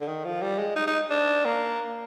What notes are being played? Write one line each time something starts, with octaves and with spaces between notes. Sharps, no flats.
D3
D#3
F3
G3
G#3
D#4
D#4
D4
A#3